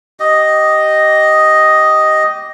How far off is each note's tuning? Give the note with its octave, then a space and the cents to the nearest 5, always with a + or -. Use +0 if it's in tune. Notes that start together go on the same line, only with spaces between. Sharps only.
G4 -15 D#5 +0